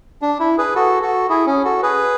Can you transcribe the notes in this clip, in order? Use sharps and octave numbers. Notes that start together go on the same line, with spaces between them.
D4
E4
G#4 B4
F#4 A4
F#4 A4
E4 G#4
C#4
F#4 A4
G#4 B4